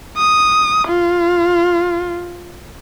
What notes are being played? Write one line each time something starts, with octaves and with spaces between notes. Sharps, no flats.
D#6
F4